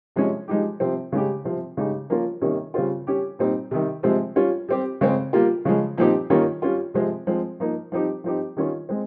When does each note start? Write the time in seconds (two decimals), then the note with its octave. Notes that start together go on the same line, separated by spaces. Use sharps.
0.16 C3 F3 G#3 C#4
0.48 F3 G#3 D#4 G4
0.80 C3 F3 C4
1.12 C#3 G#3 C#4 G4
1.45 C3 F3 C4
1.77 C#3 G#3 D#4 G4
2.10 F3 A#3 C#4 F4
2.42 C3 D#3 G3 A#3 C#4
2.74 C#3 G3 C4 F4
3.07 G3 C#4 G4
3.39 A#2 G3 C4 D#4
3.71 C3 D#3 G3
4.03 C3 F3 G#3 C4
4.36 G3 C#4 F4
4.69 G3 C4 G4
5.01 C#3 G#3 C4
5.33 G3 A#3 F4
5.65 C#3 F3 G#3
5.98 A#2 F3 C4 D#4 G4
6.30 D#3 G3 A#3 C#4 F4
6.62 G3 C#4 F4
6.94 C3 F3 G#3 C4
7.27 F3 G#3 C4
7.60 F3 A#3 D#4
7.92 F3 C4 D#4 G4
8.24 F3 C4 D#4 G4
8.57 D#3 G3 C#4 F4
8.89 G#3 C4